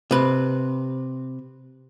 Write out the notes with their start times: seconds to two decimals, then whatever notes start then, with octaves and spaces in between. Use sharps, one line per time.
0.11 C3 B4